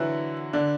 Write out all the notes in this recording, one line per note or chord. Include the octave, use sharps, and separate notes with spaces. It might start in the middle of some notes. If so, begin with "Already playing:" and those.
Already playing: D3 E3 F#3 E4 F#4
D3 D4